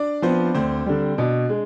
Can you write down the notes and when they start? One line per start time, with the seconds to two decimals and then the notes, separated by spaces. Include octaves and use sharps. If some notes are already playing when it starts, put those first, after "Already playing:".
Already playing: D4 D5
0.22 F3 B3 C4 C5
0.55 D2 C4 C5
0.86 D3 G3
1.18 B2 D4 D5
1.49 G#3